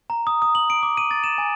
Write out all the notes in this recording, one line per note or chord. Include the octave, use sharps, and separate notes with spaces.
A#5
D#6
D#6
F#7
D7
D6
D#7
A6
E7
G#5